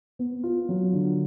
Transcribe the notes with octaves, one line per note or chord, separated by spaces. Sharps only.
B3
F4
F#3
D3